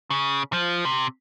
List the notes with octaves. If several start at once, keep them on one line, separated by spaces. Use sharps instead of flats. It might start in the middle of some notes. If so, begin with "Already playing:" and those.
C#3
F3
C3